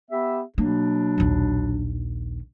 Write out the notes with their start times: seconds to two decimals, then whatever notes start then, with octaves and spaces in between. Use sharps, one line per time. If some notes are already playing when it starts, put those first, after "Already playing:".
0.10 B3 G4 E5
0.58 B2 F#3 A#3 D4
1.18 A#1 D#2